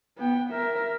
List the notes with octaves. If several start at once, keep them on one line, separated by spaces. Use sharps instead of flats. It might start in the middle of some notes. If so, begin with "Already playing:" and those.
B3 G5
A#4 E5